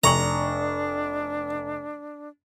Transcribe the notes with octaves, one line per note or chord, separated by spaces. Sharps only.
F1 D4 A#5 C#6 F#7